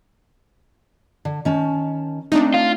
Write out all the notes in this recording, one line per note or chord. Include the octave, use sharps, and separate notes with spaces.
D3
D#3 C#4 A5
A3 C4 D4 D#4
F4